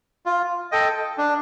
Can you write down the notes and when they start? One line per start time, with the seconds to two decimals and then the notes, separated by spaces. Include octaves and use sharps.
0.26 F4
0.72 A4 D#5 G5
1.18 D4